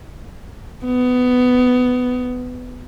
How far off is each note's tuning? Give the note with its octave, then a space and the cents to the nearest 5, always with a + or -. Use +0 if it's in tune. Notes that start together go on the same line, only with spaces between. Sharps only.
B3 +15